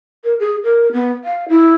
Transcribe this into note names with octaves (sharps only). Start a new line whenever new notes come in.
A#4
G#4
A#4
B3
F5
E4